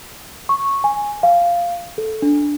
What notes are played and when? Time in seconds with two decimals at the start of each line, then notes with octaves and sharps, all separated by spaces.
0.49 C#6
0.84 G#5
1.23 F5
1.98 A4
2.22 D4